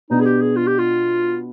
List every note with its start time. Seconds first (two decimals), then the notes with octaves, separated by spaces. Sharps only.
0.10 B2 B3 D4 D#4
0.20 G#4
0.25 G4
0.41 G#4
0.56 F4
0.67 G4
0.78 F4